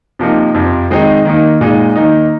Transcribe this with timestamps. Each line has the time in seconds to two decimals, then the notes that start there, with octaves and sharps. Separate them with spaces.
0.19 C3 F3 A#3 D#4
0.54 F2 C3 F3
0.90 D#3 G#3 C4 D#4
1.25 D#3 A#3 D#4
1.61 A#2 G#3 D#4
1.96 D#3 A#3 D#4